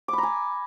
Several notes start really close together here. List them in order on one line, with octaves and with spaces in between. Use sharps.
D6 B5 A#5 G#5